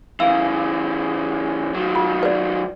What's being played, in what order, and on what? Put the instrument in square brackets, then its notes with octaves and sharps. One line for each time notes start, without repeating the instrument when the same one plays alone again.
[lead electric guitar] C#3 E3 [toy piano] F5 E6
[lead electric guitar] D#3 F#3
[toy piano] F4
B4 D5